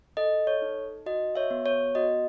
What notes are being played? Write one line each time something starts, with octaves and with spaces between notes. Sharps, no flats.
A4 D#5
C#5
D#4
F#4 D#5
C#5 E5
B3
C#5
F#4 D#5